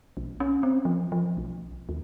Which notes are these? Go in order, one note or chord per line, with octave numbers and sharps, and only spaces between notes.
B1
C#4
C4
F3
F3
B1
D#2